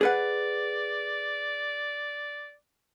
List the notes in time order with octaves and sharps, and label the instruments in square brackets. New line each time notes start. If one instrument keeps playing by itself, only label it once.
[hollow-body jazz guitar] G#4 B4 F#5 [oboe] D5